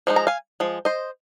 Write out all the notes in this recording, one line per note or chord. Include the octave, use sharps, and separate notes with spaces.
F3 G#3 D#4
A#5
F5 G#5
F3 G#3
C5 D#5